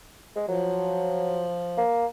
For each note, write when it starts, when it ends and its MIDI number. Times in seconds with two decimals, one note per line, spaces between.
0.36 0.44 56
0.48 1.83 53
0.48 1.45 54
1.78 2.06 58